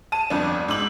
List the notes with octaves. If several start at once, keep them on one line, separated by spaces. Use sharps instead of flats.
A5 D#7
G1 F2 D4
G#2 D6 E6 F#7